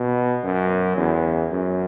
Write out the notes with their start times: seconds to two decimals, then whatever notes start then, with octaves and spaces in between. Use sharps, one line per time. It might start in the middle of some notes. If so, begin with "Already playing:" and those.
Already playing: B2
0.43 F#2
0.97 E2
1.51 F#2